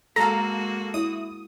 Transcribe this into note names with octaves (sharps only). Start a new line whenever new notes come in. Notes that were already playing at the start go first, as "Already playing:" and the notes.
G#3 A#3 F#4 A4 F5 A#5
E4 D#6